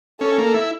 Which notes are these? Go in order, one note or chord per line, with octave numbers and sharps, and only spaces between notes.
C#4 A4
A#3
E4